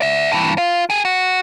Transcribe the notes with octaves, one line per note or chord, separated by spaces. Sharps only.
D5 E5
G2 E3
F4
G4 G#4
F#4